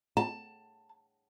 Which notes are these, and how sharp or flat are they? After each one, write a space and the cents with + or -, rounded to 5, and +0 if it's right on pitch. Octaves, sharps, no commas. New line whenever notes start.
A5 +15